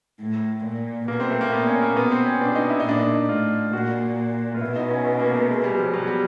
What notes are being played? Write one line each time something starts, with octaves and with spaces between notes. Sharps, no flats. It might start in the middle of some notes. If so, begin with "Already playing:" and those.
A2
A#2
B2 A#3
C4
A3
A#3
A#2 B3
C#4
A#3
B2 B3
C4
C#4
B2 D4
D#4
E4
D#4
A#2 D4
D#4
A2 F4
A#2 F#4
F4
B2 E4
D#4
C#4
B3
A#3
A3
G#3
G#3
G3
F#3
F3
B2 F#3
G3